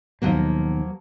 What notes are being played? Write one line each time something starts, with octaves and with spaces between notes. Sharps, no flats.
D#2 B2 F3 F#3 A#3